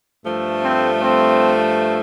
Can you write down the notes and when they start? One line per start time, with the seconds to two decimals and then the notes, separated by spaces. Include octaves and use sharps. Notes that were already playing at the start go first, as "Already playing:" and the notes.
0.24 G2 F3 A3
0.61 C4
0.99 C4